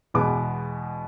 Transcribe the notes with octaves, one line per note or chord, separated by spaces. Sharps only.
E2 B2 G#3 B3 D6